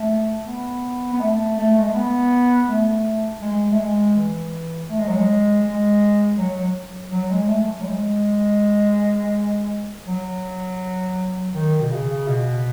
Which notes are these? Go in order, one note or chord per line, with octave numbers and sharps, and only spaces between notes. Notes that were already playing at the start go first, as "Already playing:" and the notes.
Already playing: A3
B3
B3
A3
A3
G#3
A3
B3
A3
G#3
A3
G#3
E3
A3
G#3
F#3
G#3
G#3
F#3
F#3
G#3
A3
F#3
G#3
F#3
D#3
B2
C#3
B2